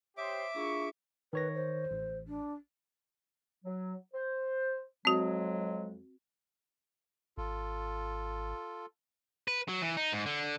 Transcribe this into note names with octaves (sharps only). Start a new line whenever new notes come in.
G4 C5 C#5 E5 D6 D#6
A#3 D4 E4 F4 G#4 C#6
D#3 B4 C#5 A#6
C5
A1
D4
F#3
C5
F2 F#3 G#3 C4 F#4
G#1 F4 A4
B4
F#3
E3
D#4
G#2
D3